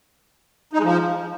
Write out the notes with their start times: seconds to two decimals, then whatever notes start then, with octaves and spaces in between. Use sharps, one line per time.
0.73 D#4
0.78 G#3
0.84 F3